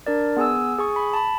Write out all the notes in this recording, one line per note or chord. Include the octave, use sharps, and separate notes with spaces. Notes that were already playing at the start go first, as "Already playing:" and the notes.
D4 A#4 D5
B3 G#4 G#5 E6
G#4 G#5 C#6
B5
A5 B5